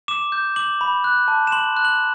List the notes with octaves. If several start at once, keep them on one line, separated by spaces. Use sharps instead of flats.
D6 E7
G6
D6 F#7
B5
F#6
A5
E7
C6 F#7
F#6
F#7